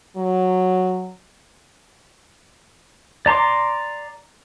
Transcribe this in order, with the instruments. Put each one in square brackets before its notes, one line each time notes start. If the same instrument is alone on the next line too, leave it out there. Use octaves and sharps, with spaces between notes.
[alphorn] F#3
[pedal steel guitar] D5 A#5 C6 D6